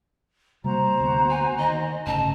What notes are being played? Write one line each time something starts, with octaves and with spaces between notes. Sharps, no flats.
C3 G3 A#3 F#4 C5 A#5
D2 A#3 B3
G#5
D#3 D#5
G1 A2 C#3 A5